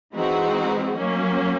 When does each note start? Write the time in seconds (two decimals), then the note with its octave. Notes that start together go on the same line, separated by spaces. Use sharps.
0.15 E3 G#3 C4 D#4 F#4
0.96 F#3 A#3 C#4